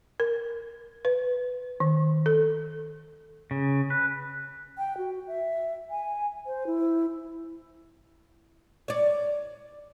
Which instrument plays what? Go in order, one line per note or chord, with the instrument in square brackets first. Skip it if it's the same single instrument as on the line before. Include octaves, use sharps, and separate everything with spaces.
[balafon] A#4
B4
D#3
A4
[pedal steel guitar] C#3
B4
[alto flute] G5
F#4
E5
G#5
C5
E4
[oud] C#5 D5